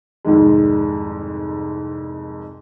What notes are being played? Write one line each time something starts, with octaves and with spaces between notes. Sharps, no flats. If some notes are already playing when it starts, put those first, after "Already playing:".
C2 F2 G#2 D#3 G#3